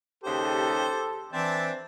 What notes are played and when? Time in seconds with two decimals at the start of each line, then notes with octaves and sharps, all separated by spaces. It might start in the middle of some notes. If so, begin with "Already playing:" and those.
0.24 D#2 C#3 D#4 G4 A4 C5
1.33 E3 C4 D4 E5 A5